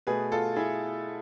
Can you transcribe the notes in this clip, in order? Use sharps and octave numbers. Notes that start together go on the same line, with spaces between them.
B2 A3 G#4 B4
F4 A4
E4 G#4